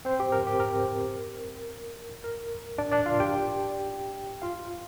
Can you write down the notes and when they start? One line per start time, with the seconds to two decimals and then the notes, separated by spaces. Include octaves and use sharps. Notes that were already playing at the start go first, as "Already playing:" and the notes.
0.05 C4 C5
0.20 G4
0.32 A#4
0.47 G4
0.60 A#4
2.24 A#4
2.78 D4 D5
2.92 D4 D5
3.06 F4 F5
3.20 G4 G5
4.42 F4 F5